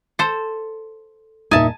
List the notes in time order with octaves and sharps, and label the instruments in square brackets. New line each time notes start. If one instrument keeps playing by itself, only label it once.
[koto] A4 C5
[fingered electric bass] E2 G2 A#2 [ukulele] D#4 E5 [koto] G#5 A5